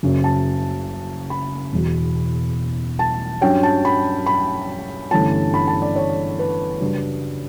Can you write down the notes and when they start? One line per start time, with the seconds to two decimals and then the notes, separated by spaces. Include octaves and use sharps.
0.03 F#1 F#2 C#3
0.24 A5
1.30 B5
1.73 E1 E2 B2
2.99 A5
3.41 G2 F#3 C#4 G5
3.63 A5
3.85 B5
4.26 B5
5.11 G1 G2 E3 A3 C#4 A5
5.54 B5
5.68 A5
5.82 D5
5.96 C#5
6.39 B4
6.81 F#2 C#3 G3 D4